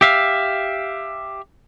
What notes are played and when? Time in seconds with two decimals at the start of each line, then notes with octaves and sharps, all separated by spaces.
0.01 G4 E5 F5